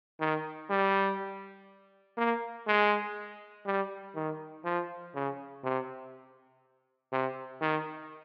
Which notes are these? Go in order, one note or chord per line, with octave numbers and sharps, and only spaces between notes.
D#3
G3
A#3
G#3
G3
D#3
F3
C#3
C3
C3
D#3